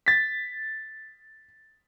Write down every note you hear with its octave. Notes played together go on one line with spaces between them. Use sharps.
A6 B6